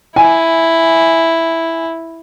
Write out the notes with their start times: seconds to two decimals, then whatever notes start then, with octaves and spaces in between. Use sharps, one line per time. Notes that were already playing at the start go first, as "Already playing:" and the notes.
0.16 E4 G#5